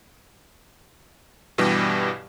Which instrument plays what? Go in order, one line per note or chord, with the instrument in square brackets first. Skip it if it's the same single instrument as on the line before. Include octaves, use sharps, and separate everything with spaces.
[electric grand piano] G2 B2 E3 G3 G4